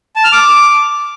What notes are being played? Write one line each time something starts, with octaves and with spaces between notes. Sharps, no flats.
A5
F6
D6